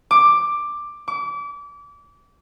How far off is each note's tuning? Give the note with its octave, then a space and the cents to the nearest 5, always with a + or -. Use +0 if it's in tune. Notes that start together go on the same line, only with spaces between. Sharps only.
D6 +10
D6 -30